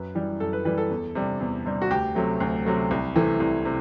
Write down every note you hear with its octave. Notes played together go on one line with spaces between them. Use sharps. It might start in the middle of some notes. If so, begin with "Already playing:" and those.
Already playing: F#2 B4
E3 G3
F#2 A4
B4
E3 G3 B4
A4
E2
C3 G3
E2
C3 G3
F#4
D2 G4
C3 F#3 A3
D2
C3 F#3 A3
C2
C3 E3 A3
C2
C3